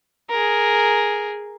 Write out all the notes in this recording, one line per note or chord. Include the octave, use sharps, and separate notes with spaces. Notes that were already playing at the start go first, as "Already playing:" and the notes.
G#4 A#4